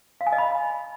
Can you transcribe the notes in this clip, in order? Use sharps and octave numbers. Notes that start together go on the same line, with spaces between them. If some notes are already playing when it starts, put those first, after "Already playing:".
F5
G#5
D#5
B5